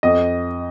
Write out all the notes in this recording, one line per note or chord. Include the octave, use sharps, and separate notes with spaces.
F2 D#5